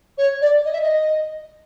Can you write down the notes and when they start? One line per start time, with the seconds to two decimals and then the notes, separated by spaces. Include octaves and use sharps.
0.18 C#5
0.41 D5
0.65 D#5
0.73 E5
0.81 D#5